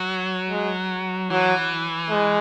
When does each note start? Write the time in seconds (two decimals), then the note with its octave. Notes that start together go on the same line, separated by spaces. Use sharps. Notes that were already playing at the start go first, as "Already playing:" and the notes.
Already playing: F#3
0.50 G#3
1.30 E3 F#3
2.10 G#3